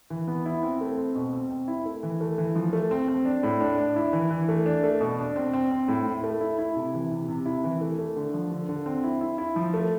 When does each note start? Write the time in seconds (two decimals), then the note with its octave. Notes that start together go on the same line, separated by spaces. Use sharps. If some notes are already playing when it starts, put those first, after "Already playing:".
0.10 E3
0.28 B3
0.46 E4
0.63 C4
0.81 A3
0.97 C4
1.15 B2
1.33 C4
1.51 C4
1.68 E4
1.86 A3
2.03 E3
2.21 A3
2.38 E3
2.55 F3
2.73 A3
2.91 C4
3.08 C4
3.25 D4
3.43 A2
3.61 D4
3.78 D4
3.96 E4
4.13 E3
4.31 E3
4.49 A3
4.66 D4
4.83 A3
5.01 B2
5.19 D4
5.36 C4
5.53 C4
5.71 C4
5.88 A2
6.06 E4
6.24 A3
6.41 E4
6.59 E4
6.76 C3
6.94 E3
7.11 C3
7.28 C3
7.46 E4
7.64 E3
7.81 A3
7.99 A3
8.16 D3
8.34 F3
8.51 D3
8.69 D3
8.86 C4
9.04 E4
9.21 E4
9.38 E4
9.56 F3
9.74 A3